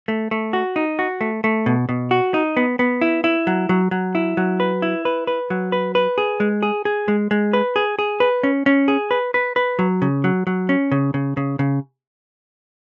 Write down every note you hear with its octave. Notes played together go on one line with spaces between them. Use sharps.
A3
A3
F#4
D#4
F#4
A3
A3
B2
B2
F#4
D#4
B3
B3
E4
E4
F#3
F#3
F#3
E4
F#3
B4
E4
B4
B4
F#3
B4
B4
G#4
G#3
G#4
G#4
G#3
G#3
B4
G#4
G#4
B4
C#4
C#4
G#4
B4
B4
B4
F#3
C#3
F#3
F#3
C#4
C#3
C#3
C#3
C#3